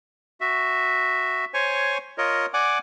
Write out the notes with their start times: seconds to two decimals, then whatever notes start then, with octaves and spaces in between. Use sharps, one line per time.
0.41 F#4 E5
1.54 C5 C#5 G#5 C#6
2.18 F4 A#4 C#5 D#5
2.54 D5 F#5 G#5 D6